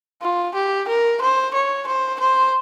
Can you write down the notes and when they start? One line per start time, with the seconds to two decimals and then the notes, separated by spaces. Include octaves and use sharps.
0.22 F4
0.55 G4
0.88 A#4
1.22 C5
1.54 C#5
1.87 C5
2.20 C5